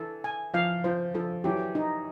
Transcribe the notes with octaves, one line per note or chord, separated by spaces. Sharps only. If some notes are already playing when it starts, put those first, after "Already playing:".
Already playing: E3 A4
G#5
F3 F5
F3 C5
F3 A4
E3 F#3 G4
D#4